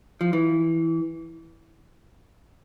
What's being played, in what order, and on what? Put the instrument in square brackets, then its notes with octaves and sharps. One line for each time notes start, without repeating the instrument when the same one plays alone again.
[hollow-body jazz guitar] F3
E3